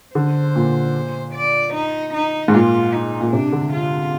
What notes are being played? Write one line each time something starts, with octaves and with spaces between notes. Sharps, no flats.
D3 C5
A#2
D5
D#4
D#4
G#2
A#2 F4
D#4
A#2
C3 D4
D3
F4